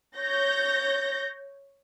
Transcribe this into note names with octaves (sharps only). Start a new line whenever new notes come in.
C#5 G6 A#6